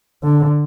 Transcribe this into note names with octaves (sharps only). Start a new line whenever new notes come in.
D3